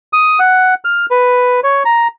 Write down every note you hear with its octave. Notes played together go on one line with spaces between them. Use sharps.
D#6
F#5
F6
B4
C#5
A#5